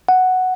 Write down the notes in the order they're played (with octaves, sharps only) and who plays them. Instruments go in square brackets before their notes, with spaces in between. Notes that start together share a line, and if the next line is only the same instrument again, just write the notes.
[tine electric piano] F#5